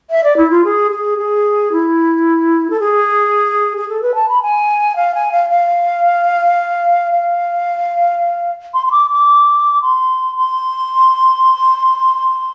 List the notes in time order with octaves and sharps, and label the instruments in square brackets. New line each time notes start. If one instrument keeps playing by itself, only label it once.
[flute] E5
D5
E4
F4
G#4
G#4
G#4
E4
A4
G#4
G#4
A4
B4
A5
B5
G#5
F5
G#5
F5
F5
F5
C6
C6
D6
D6
C6
C6